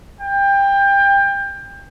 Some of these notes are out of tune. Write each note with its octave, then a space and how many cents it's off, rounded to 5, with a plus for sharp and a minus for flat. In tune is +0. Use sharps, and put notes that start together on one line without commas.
G5 +25